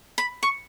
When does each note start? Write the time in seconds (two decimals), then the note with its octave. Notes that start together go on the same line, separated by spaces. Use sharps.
0.18 B5
0.43 C#6